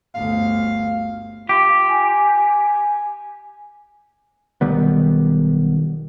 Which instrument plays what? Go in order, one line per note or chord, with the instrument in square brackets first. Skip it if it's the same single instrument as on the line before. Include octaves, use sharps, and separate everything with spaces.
[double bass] G1 D2 [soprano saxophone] F5
[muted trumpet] F4 [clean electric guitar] G4
[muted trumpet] G#5
[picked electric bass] B1 D#3 G3 B3